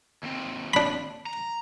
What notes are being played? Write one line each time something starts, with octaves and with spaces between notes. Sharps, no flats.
D#2 C4
D4 B5
A#5